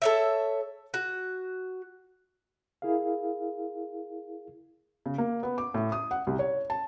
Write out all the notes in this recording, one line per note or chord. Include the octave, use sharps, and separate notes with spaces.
A4 C#5 E5
F#4
E4 G#4 A#4 F5
C#3
A#3
B3
D6
A2
D#6
F#5
C2
C#5
A5